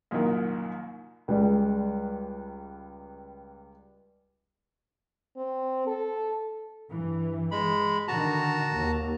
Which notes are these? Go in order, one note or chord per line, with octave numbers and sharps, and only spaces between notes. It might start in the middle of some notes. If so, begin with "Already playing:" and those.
C2 F#2 A#2 D#3 A#3
C#2 G3 G#3
C4
A4
G2 E3
G#3 B5
D3 D#3 F#4 A5 A#5
D#2